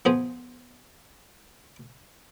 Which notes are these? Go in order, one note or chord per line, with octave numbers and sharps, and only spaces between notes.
F3 B3 G#4 C5